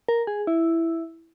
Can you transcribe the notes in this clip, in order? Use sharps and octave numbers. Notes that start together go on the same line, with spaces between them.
A#4
G#4
E4